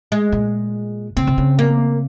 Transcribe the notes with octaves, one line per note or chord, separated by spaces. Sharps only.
G#3
A#2
C#3 C4
C3
C#3
A#3